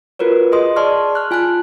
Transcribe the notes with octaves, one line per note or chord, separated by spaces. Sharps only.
F4 F#4 A#4 B4 C#5
G#4 D#5 C6 D#6
G#4 D5 A5 C6 C#6 F6
F6 F#6
F4 G#5 A5 F#6